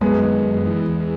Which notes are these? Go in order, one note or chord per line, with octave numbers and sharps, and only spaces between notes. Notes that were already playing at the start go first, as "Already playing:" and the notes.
F#2 G#3 B3
D#3
F#2
E3
E2